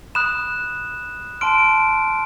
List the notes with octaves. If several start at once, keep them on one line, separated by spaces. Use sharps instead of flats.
B5 D#6 F#6 E7
A5 C6 F6 D7